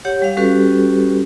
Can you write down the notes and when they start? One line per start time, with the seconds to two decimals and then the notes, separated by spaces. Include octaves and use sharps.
0.05 G4 C#5 F#5
0.22 G3 F5
0.37 G3 C#4 F#4 G4 A4 B4